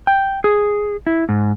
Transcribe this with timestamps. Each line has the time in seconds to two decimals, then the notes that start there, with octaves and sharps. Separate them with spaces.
0.07 G5
0.44 G#4
1.07 E4
1.29 G#2